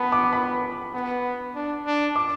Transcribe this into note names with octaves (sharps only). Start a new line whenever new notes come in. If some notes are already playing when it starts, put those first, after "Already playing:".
Already playing: B3 A5 B5
D6
B5
B3
D4
D4
D6